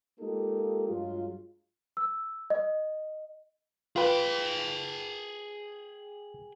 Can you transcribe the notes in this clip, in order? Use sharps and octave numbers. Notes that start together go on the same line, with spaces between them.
G#3 A#3 D#4 F4 G4 A4
G2 F#3 G#3 F4
E6
D#5
F4 G#4 B4 G5